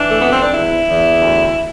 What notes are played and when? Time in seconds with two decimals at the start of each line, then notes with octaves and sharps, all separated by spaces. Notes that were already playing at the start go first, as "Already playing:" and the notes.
Already playing: E3 D4
0.09 A3
0.19 F2 B3
0.30 C4
0.42 D4
0.53 E2 E4
0.86 E2
1.20 D2